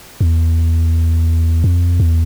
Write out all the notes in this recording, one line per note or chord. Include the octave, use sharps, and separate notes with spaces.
E2
F2
E2